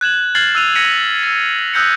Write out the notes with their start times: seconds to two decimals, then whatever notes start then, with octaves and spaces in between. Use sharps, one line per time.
0.01 F#6 G#6 E7 F#7
0.35 F6 G#6 A6 C7 F#7
0.55 E6 F#6 D#7 F7
0.75 G#6 A#6 B6 C#7 D#7
1.23 E6 A6
1.74 D#6 E6 F#6 G6 A#6 C#7